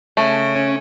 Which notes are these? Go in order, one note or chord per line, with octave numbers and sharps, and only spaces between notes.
C#3 A3
C#4